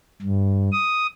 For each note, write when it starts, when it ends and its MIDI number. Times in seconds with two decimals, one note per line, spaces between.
0.22 0.70 43
0.72 1.06 87